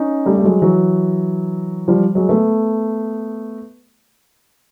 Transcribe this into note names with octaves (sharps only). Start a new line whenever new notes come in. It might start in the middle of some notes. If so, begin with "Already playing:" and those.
Already playing: C#4 D#4
G3 A3
A3
F#3 G#3
E3 F#3
F3 G3
F#3 G#3
A3 B3